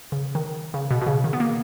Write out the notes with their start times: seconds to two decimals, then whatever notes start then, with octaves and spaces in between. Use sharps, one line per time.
0.12 C#3
0.35 D#3
0.74 C#3
0.91 B2
1.02 B2
1.07 C#3
1.24 D#3
1.33 B3
1.40 A#3